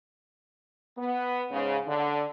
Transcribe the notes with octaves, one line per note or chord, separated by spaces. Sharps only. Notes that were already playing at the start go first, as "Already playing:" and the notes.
B3
G#2 C#3
D3